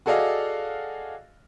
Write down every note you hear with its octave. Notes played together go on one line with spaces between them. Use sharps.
F#4 G#4 A4 D5 D#5 F5